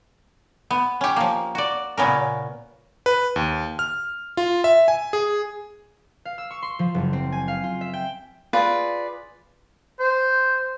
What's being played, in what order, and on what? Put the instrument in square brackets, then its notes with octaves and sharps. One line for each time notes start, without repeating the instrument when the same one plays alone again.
[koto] B3
C#4 G4
F3 A#3
F#4 D5
A#2 C#3 B3 C#4 A#4
[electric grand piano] B4
D#2
F6
F4
E5
G#5
G#4
[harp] F5
E6
C#6
C6
F3
F#1
C4
G#5
F5
F4
E5
G5
[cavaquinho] F4 G#4 B4 D5
[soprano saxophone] C5